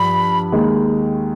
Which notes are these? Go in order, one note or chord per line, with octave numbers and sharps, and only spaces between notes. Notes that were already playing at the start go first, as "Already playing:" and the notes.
Already playing: G2 F3 B5
D#2 D#3 G#3